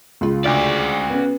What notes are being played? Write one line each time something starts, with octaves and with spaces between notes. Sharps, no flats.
C#2 F4
D2 F#4 D5
B3 C#4